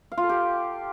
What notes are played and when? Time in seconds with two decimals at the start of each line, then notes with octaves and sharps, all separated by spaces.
0.12 F5
0.18 F4
0.23 A4
0.29 G4